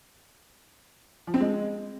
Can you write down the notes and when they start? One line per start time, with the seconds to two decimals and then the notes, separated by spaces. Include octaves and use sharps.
1.27 F3
1.34 C4
1.40 G#3